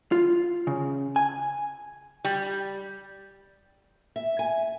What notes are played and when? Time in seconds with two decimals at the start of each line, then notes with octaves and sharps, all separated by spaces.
0.12 F4
0.67 C#3
1.16 G#5
2.25 G3
4.16 E5
4.39 G#5